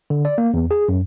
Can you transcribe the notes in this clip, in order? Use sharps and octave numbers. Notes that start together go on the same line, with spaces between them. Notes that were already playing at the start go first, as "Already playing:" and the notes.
D3
D5
A#3
E2
G#4
F#2